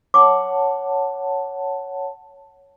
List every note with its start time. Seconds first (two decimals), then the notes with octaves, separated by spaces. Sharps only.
0.14 C#5 F#5 A5 D6